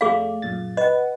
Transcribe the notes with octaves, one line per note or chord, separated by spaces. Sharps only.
F2 A3 G#4 D5 F5
F#2 A#2 A6
B4 D#5 F#5